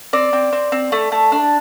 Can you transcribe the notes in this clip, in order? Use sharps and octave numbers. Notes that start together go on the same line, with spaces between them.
C4 D5
C4
C4
C4
A3
A3
D4